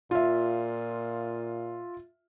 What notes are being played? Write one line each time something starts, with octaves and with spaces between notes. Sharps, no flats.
A#2 F4 E5